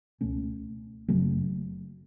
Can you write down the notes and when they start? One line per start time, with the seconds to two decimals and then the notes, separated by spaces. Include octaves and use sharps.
0.21 C#2 B2 A3 C#4
1.08 F#1 E2 C#3 F#3 A3